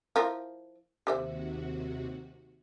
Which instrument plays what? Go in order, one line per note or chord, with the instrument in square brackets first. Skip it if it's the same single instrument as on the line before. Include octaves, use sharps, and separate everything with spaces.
[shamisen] F3 E4 A#4
[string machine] D#2 C3 F#4 [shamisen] G4 C5 E5